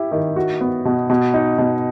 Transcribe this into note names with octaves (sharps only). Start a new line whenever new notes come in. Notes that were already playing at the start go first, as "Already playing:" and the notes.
Already playing: E4 G4
D#3
F#4
B3
B2
B2
D#4
B2